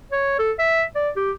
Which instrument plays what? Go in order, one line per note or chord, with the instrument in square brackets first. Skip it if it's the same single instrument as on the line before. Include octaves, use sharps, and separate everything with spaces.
[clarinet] C#5
A4
E5
D5
G4